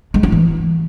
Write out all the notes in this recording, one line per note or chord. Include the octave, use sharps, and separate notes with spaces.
G#3
E4
E3